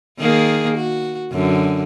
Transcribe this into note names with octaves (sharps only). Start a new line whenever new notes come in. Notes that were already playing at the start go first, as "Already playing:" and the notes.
D#3 A#3 G#4
F#4
F#2 D3